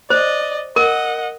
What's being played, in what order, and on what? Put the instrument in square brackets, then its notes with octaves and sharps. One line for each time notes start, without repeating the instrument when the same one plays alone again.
[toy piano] C5 [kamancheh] D5 D#5
[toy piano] A#4 [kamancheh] D#5 F#5